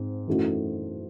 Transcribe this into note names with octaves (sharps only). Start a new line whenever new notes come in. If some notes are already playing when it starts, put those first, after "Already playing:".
Already playing: G#2 C4
F#2 E3 A3 D#4 F#4